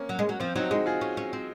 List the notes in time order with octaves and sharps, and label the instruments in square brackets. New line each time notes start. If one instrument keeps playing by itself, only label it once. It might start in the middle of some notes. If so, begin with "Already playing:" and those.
Already playing: [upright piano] A#3 C4 C#4
[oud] F#3
G#3
F#3
[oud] F3 [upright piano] C4
[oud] F#3 [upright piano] C4 D#4
[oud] G#3 [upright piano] D#4 F#4
[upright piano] F4 G#4
[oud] C#4
C#4
C4